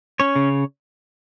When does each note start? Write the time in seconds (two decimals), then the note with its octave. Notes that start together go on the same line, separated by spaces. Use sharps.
0.20 C#4 C#5
0.36 C#3